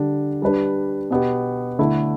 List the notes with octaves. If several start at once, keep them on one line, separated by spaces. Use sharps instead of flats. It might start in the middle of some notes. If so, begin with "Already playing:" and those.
Already playing: D3 G3 D4
G3 D4 B4
B2 B3 G4
D3 A3 E4